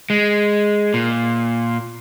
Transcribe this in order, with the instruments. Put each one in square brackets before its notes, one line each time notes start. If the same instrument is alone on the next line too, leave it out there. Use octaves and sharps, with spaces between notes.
[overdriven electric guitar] G#3
A#2